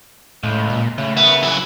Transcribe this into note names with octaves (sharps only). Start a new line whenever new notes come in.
C#2 A2
A#2
A2 C#3
B3 A#4 E5
F#3 E4